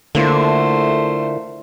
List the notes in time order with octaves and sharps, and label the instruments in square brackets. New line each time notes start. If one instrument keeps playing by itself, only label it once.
[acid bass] D3 [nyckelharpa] A3 C5 [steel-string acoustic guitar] A#3 E4 F4